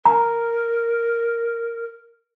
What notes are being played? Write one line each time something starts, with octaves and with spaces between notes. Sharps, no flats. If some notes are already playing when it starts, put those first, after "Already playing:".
A#4 A#5